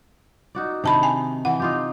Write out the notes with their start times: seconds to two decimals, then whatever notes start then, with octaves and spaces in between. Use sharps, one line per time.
0.55 D#4 F#4 D5
0.84 C3 D#3 D4 A5 B5
1.03 G#5
1.45 E3 F#5
1.60 D#4 F4 G4